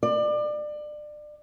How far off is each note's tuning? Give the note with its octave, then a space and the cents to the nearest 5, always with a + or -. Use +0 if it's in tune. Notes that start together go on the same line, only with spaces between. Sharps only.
D5 +30